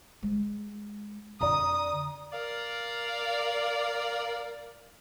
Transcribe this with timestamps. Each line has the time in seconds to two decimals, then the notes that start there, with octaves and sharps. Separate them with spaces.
0.23 G#3
1.41 F2 D3 D5 A#5 D#6
2.32 A#4 D5 F5